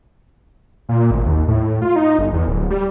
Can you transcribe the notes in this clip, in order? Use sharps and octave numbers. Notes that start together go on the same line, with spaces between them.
A#2
G#1
D#2
A2
F4
D#4
G1
E2
D1
G3